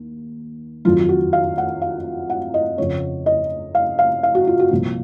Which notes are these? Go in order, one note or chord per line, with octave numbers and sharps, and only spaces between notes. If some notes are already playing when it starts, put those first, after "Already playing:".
Already playing: D#2
F2 D#3 F#3 F4
F#4
F5
F#5
F5
F#5
D#5
F2 C#3 F3 C#5
D#5
F5
F5
F5
F#4
F4
F#4
C2 A#2 F3